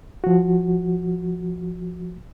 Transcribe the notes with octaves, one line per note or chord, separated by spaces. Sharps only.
F3 F#4